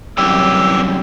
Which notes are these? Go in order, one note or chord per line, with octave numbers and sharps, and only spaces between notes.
C2 F#2 E3 G4 E6